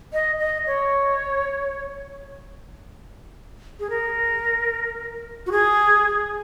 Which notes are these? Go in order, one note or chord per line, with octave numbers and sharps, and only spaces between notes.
D#5
D#5
C#5
G#4
A#4
F#4
G#4